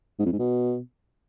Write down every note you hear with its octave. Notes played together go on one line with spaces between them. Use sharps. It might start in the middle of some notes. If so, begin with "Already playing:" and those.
G#2
F2
G#2
B2